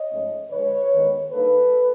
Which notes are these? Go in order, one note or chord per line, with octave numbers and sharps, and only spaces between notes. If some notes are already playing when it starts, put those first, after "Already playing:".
Already playing: C#5 D#5
G#2 F3 A3 C#4
D3 F3 G#3 B4 C#5
D#2 D#3 G#3 B3 D#4
D3 G3 A#3 D#4 A4 B4